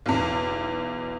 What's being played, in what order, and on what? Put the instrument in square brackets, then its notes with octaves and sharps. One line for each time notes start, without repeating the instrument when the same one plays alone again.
[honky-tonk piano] B1 E2